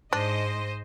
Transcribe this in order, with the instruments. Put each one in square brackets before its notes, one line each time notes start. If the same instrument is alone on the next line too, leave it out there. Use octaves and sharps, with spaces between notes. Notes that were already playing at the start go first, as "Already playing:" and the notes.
[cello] G#2 [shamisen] D4 [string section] C5 D#5